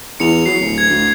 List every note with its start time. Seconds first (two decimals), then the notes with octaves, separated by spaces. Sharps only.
0.20 E2 C#7 F7
0.46 F#3 C7
0.60 D1
0.78 G#6
0.90 D2